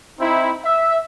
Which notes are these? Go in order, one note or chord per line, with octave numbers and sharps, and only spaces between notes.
C4 D#4 E4
E5